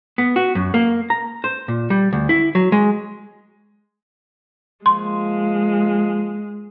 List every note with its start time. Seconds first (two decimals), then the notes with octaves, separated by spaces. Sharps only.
0.18 B3
0.36 F#4
0.55 F#2
0.74 A#3
1.10 A#5
1.44 C5
1.68 A#2
1.90 G3
2.13 D2
2.29 E4
2.55 F#3
2.72 G#3
4.86 F3 G#3 A#3 F4 C6